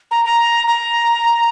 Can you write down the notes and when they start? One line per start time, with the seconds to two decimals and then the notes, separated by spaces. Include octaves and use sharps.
0.11 A#5
0.25 A#5
0.68 A#5